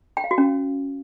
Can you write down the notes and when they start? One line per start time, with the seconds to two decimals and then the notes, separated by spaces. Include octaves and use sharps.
0.17 G5
0.24 F5
0.31 F#4
0.38 C#4